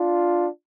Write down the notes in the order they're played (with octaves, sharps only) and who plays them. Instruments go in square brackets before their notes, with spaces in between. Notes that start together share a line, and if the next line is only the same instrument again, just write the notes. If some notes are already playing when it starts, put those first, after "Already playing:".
Already playing: [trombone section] D4 F4